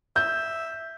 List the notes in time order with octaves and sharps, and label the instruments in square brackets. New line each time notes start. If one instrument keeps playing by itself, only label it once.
[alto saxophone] E5 [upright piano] G6